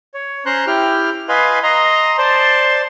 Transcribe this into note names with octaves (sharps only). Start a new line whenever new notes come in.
C#5
C#4 C5 A#5 C6 F#6
E4 G4 G5 F6
B4 D#5 F5 G#5 B5 C6
D#5 A#5 C6
C5 D5 A5 C6